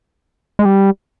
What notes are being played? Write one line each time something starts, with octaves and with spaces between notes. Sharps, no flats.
G#3
G3